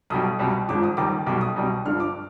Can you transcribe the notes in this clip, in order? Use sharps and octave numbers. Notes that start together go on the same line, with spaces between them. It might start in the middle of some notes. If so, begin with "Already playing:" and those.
B1 B2 G3 D#6
C2 B2 G3
G#1 G#2 F3 D6
D#6
D#2 D#3 G3 D6
B1 B2 G3 D6
D#6
C2 B2 G3
G1 G2 D3 F3 F6
D6